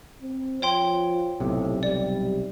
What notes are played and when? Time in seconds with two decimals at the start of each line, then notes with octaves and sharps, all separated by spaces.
0.22 C4
0.62 F3 C#5 G5 C6
1.40 B1 A2 C3
1.83 G3 D5